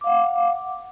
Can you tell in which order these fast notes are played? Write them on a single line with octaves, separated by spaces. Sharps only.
D6 F5 F#5